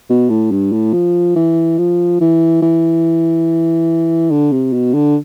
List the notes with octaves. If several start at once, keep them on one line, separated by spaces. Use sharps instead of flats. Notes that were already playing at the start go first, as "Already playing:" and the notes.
B2
A2
G2
A2
F3
E3
F3
E3
E3
D3
C3
B2
D3